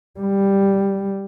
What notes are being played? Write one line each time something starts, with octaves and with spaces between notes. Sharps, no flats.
G3